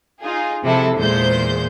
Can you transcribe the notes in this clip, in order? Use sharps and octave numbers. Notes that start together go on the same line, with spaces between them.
D#4 F4 G#4
C3 F3 G#3 E4 A4
E2 A#2 G#3 C5 G6